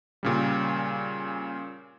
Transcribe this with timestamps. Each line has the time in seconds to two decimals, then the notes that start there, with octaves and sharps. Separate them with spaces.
0.23 A#2 C#3 G3